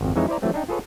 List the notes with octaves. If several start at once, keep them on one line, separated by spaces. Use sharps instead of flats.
G#1 F2
F2 E3 G#3 D#4 C#5 E5
E4 C5 D5 A#5
E3 F#3 A3 C4
D4 D#4 G5
F4 G#4 A4 B4 C#5